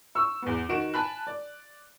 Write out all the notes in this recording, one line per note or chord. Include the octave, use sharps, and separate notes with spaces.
C#6 E6
E2 B3
D#3 F#4 D7 E7
G#5 A5 B5 F#6
D5